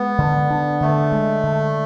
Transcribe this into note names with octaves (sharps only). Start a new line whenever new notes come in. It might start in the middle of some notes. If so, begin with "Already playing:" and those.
Already playing: G#3 B3
D3
D4
D3 A3
G#3
D3